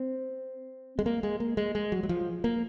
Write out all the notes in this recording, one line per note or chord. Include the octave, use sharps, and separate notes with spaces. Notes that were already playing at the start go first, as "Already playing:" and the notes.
Already playing: C4
G#3
A#3
G#3
A#3
G#3
G#3
F#3
F#3
F3
A#3